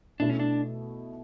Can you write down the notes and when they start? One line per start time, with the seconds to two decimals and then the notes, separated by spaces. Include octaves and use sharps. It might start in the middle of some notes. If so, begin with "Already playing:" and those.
0.20 B2 A3 D4 E4 A4
0.29 C#4
0.40 D4